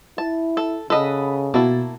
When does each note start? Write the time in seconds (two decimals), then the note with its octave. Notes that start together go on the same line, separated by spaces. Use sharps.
0.18 E4 A5
0.57 A4
0.90 C#3 A4 D#5 F#5 B5 D#6
1.54 B2 A#3 E4 F#4 A5